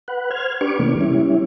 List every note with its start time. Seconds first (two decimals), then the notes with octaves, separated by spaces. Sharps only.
0.08 B4 F#5
0.31 C5 F6 G#6
0.61 D4 G4 B4 C#6 D6
0.79 C3 E3 A3 A#3 C#4
1.01 G3 C#4 E4